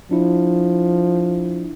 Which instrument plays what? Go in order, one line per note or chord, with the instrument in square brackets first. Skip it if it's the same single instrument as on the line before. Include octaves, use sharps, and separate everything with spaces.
[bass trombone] F3 [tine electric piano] D4 E4